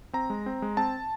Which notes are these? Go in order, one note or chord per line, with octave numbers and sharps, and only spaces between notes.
C4 A#5
G#3
C4
G#3
C4 A5